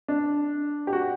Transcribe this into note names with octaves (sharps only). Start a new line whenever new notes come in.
D4
G4
F#4